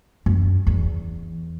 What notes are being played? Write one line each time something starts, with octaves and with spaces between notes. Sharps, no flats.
F#2
E2